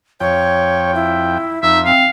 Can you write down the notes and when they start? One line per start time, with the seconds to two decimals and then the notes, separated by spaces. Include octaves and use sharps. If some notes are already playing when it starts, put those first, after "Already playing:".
0.20 F2 C#5 G5
0.95 E4
1.63 F2 D#4 E5
1.86 C4 F5